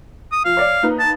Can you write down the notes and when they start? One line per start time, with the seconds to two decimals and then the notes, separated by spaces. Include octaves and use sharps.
0.32 D#6
0.45 F3 F5
0.57 C#5 D5
0.82 A#3 D#4 B4
0.99 A5